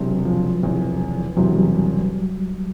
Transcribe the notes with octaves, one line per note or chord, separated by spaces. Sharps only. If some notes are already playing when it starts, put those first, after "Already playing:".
Already playing: E1 E2 C3 F#3
F3
E1 E2 C3
E1 E2 C3 F#3
G3